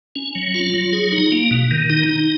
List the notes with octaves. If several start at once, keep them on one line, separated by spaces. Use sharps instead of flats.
C#4
F#3
F4
F#3
G#4
D#4
A#3
B2
D#3
D#4
D#4